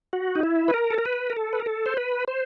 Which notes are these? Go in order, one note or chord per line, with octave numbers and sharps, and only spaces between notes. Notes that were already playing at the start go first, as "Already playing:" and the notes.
F#4
D#4
E4
B4
A#4
A4
A#4
B4
A#4
A4
B4
A#4
A4
C5
B4
C5